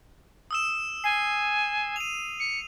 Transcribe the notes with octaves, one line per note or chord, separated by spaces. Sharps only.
D#6 E6 E7
G#5 C7
D#7 F7
C#7